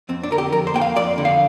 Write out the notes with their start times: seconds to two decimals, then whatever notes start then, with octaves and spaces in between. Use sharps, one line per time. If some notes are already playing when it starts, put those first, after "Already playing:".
0.09 F2 C4
0.23 D4
0.31 D3 A#4
0.38 G4
0.52 F2 A#4
0.67 C5
0.74 A#3 G5
0.81 F5
0.96 F2 D5
1.18 D3
1.25 F5